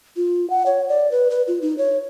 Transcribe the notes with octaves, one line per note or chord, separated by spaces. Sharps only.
F4
F#5
C#5
D5
B4
B4
F4
D#4
C#5